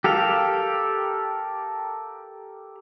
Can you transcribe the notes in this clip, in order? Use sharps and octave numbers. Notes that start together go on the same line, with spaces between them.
G4 A4 A#4 F5